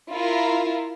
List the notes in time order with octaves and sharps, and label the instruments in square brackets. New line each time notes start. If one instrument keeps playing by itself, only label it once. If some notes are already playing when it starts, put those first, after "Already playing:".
[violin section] E4 F4 A#4